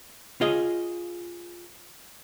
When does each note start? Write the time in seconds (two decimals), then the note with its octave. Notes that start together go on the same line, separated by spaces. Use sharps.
0.41 F4 G#4 D#5